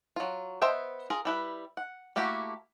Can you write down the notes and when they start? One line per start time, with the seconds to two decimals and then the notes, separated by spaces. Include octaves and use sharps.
0.16 F#3 F4
0.62 B3 C5 D#5 E5 G5
1.10 F4 G#4 A#4
1.25 G3 E4 B4
1.77 F#5
2.16 A3 A#3 E4 F#4 G4